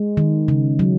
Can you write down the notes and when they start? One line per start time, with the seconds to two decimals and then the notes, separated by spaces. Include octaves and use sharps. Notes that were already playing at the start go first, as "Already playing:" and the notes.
Already playing: G#3
0.17 D#3
0.48 C#3
0.79 F#3